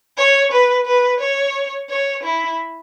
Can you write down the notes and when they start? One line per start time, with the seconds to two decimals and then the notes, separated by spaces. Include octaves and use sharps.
0.17 C#5
0.52 B4
0.86 B4
1.21 C#5
1.89 C#5
2.24 E4